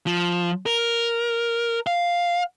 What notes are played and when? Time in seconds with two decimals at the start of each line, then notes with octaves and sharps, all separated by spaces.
0.07 F3
0.66 A#4
1.87 F5